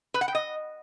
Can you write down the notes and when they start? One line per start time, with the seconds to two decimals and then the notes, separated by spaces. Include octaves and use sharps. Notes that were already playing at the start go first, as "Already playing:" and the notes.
0.14 B4
0.21 F#5
0.28 G5
0.35 D#5